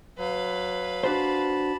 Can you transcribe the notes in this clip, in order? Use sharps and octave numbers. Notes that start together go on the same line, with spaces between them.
F#3 B4 F5
D4 F#4 C5 A5 B5